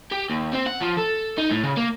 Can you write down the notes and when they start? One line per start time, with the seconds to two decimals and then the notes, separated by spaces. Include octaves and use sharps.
0.12 G4
0.30 D#2
0.53 C4
0.67 F#5
0.81 F3
0.98 A4
1.38 D#4
1.51 A2
1.63 C#3
1.77 A#3